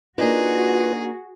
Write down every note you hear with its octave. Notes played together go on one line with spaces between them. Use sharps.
A#3 D4 D#4 F4 F#4 G#4 B4